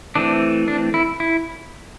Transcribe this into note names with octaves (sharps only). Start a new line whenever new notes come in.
E3 A3 C4 D4
D4
E4
E4